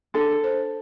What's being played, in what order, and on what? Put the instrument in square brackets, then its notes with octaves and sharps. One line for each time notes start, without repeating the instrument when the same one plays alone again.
[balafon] D4 [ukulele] A4
[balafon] C5